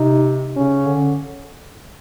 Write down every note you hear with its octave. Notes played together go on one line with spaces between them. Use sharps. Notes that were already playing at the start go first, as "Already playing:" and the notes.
Already playing: C3 D#4
C#3 C#4
D3